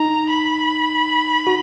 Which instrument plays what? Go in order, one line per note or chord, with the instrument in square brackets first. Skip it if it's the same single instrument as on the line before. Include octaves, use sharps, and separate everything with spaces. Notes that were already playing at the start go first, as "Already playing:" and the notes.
Already playing: [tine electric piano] D#4 [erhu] A#5
[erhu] B5
[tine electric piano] F#4